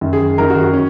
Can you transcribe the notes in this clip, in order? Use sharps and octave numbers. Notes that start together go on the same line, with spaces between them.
F#2 D#3
G#4
F#2 D#3 A#4
F#4
F#4
C#4